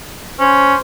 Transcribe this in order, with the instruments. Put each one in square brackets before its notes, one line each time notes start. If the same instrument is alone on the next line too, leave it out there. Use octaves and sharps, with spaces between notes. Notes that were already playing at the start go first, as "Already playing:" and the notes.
[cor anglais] C#4 [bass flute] C5